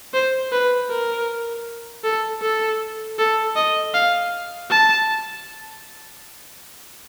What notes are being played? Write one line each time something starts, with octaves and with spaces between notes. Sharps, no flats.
C5
B4
A#4
A4
A4
A4
D#5
F5
A5